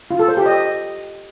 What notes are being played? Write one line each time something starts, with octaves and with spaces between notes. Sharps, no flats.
F4
A4
C5
G4
D#5